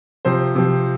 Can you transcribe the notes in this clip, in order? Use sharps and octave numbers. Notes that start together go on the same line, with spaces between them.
C3 F3 C5
C3 F3